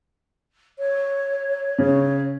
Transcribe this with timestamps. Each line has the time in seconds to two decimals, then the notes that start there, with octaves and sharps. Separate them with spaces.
0.78 C#5
1.78 C#3 C#5